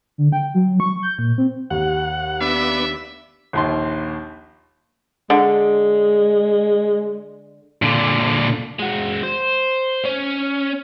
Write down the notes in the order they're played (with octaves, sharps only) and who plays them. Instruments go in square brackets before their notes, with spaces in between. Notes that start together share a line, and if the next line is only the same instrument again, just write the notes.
[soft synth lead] D3
G5
F#3
C#6
G6
A#2
C4
[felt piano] D#2 [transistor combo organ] F#5
[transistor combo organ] B3 D4 [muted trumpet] E5
[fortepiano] A#1 D#2 C6
[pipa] D3 [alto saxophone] G#3
[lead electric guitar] A#2 D3
[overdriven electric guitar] G#3 F#4
C5
C#4